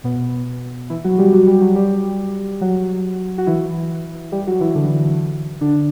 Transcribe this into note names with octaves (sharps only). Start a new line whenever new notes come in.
B2 B3
E3 E4
F#3 F#4
G3 G4
F#3 F#4
G3 G4
F#3 F#4
G3 G4
F#3 F#4
F#4
E3 E4
G3 G4
F#3 F#4
E3 E4
D3 D4
D3 D4